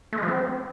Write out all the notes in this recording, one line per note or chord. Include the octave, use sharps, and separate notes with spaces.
A3
G#3
F3
C4